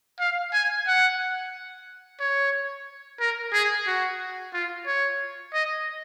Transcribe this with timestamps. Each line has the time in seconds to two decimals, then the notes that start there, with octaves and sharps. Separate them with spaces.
0.20 F5
0.53 G#5
0.87 F#5
2.20 C#5
3.20 A#4
3.53 G#4
3.87 F#4
4.53 F4
4.87 C#5
5.53 D#5